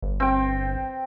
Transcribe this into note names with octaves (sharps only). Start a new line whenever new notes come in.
G1
C4 G5